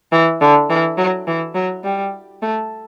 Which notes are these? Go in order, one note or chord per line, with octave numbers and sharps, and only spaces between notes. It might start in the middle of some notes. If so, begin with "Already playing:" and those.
E3
D3
E3
F#3
E3
F#3
G3
A3